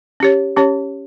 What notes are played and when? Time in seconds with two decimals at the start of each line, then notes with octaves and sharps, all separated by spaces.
0.20 C#4 G4 C#5
0.57 C#4 G4 C#5